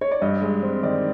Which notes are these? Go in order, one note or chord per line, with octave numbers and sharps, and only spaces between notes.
C#5
D5
G2 D#5
G#3
C4
D#3 D5